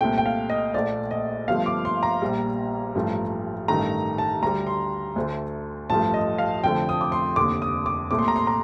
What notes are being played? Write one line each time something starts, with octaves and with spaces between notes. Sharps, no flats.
C2 A#2 A3 G5
G5
F5
D#5
A#1 A#2 A3 D5
D#5
G1 G2 F3 A3 F5
D6
C6
A#5
A#1 A#2 G3
A1 G2 F3 A3
A1 G2 D#3 A3 A#5
A5
D2 D3 G3 A#5
C6
D2 D3 A3
A1 G2 F3 A3 A5
D#5
F5
F1 F2 D3 F3 A3 G5
D#6
D6
C6
F1 D#2 D3 D6
D#6
D6
C2 A#2 A3 D6
C6
A#5
C6
A#5